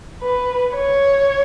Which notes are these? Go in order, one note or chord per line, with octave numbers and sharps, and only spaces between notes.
B4
C#5